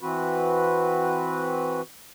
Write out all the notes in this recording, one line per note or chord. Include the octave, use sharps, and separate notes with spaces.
E3 C4 F#4 B4